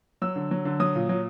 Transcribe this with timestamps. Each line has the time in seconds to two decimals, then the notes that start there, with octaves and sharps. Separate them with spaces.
0.22 F#3 E6
0.36 D3
0.51 F#3
0.65 D3
0.80 F#3 D#6
0.95 A#2
1.09 F#3